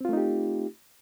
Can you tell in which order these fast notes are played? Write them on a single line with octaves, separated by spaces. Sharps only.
C4 F4 A3 D#4 G4